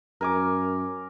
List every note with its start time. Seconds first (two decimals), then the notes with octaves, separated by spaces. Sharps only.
0.21 F#2 A#4 G#5 D6